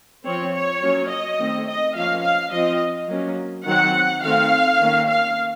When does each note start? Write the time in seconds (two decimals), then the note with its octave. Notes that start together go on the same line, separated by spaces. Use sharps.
0.24 F3 C4 C#5
0.54 C#5
0.82 F#3 A#3 C#4
1.10 D#5
1.38 D#3 A3 C4
1.67 D#5
1.95 F3 A#3 C#4 F5
2.23 F5
2.52 F3 C4 D#5
3.09 F#3 A#3 C#4
3.66 D#3 F#3 C4 F#5
4.22 D#3 A3 C4 F5
4.80 D#3 A#3 C#4
5.07 F5